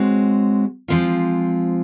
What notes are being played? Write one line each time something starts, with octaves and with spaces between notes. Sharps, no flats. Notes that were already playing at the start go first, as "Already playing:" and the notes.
Already playing: G#3 C4 F#4 C#5
F3 G#3 C4 F4